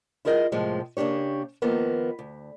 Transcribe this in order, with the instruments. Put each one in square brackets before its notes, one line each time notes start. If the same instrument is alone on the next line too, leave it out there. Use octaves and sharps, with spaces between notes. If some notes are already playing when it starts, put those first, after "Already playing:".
[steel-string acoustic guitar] E4 F4 G#4 A#4 D#5
D#2 A2 C3 F3 G#3
C#3 A#3 D4 G4 C#5
D#3 F3 A#3 B3
D2